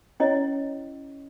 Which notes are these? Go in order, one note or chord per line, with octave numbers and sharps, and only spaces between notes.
C#4 E4 C#5 D#5